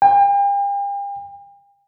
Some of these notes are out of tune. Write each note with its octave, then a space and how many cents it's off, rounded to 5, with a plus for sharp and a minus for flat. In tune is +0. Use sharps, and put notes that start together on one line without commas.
G5 +40